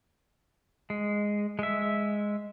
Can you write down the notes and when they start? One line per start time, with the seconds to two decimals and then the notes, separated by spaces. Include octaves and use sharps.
0.90 G#3
1.59 G#3 E5